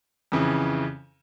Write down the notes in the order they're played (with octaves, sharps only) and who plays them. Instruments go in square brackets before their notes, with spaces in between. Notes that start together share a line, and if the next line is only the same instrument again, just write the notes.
[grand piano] F2 C#3 E3